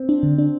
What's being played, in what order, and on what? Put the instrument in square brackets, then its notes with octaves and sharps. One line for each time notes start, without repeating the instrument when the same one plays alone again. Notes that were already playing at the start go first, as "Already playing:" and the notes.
Already playing: [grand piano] C4
[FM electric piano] D4
D3
D4